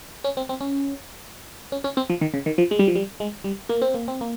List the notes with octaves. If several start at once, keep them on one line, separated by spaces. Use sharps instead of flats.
C#4
C4
C4
C#4
C#4
C#4
C4
F3
D#3
C#3
D#3
F3
G#3
G3
F3
G3
G#3
G3
A#3
C4
A#3
C4
A#3